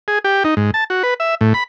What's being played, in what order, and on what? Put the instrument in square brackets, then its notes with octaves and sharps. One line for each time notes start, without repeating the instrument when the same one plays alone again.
[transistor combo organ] G#4
G4
D#4
G#2
A5
F#4
B4
E5
A2
B5